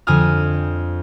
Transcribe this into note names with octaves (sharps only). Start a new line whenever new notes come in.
F2 D3 G#5 D#6 F6